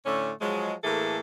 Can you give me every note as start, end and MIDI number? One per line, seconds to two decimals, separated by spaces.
0.05 0.31 45
0.05 0.31 50
0.05 0.31 57
0.05 0.31 61
0.40 0.73 53
0.40 0.73 54
0.40 0.73 56
0.84 1.20 45
0.84 1.20 52
0.84 1.20 58
0.84 1.20 68
0.84 1.20 69